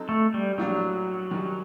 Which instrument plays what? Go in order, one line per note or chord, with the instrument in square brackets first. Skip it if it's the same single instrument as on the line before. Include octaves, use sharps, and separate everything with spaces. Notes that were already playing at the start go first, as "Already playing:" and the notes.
Already playing: [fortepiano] F#3 C4 D#4 A4
[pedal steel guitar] A3
G3
[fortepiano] A#1 A2 G3 A#3 D4 [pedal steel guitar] F#3
[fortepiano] F#2 D#3 G3